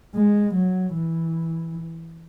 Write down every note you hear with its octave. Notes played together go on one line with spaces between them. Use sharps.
G#3
F#3
E3